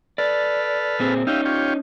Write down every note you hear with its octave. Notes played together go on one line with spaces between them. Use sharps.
A4 B4 D5 F6
A#2 C4 G#4
C#4 D#4 G4 E5 F5
F4 G4 C#5